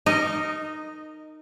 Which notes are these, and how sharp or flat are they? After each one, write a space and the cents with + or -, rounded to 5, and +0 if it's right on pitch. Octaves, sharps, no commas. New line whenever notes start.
D#4 -15 A#4 -30 D#5 +0